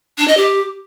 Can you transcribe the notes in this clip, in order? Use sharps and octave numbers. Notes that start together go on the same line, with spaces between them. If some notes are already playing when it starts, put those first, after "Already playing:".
D4
D#5
G4